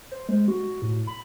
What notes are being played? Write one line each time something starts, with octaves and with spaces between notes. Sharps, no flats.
C5
G#3
F#4
A2
B5